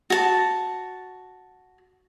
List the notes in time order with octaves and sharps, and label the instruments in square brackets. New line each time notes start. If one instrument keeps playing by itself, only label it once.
[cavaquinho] F#4 A5